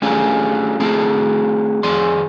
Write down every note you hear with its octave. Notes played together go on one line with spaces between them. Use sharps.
A3 C#4 D4 F4 G4 G#4
A3 C4 E4 G#4 A5
F2 G#4 D5 C6